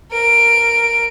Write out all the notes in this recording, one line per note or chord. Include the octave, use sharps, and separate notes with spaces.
A#4 D7